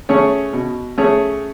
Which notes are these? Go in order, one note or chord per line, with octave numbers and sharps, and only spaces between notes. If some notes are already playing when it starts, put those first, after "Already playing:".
A3 C#4 G#4 C#5
B2
A3 C#4 G#4 C#5